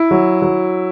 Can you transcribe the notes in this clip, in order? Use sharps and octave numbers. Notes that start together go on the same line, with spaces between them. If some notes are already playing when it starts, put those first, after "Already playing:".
Already playing: E4
F#3
F#3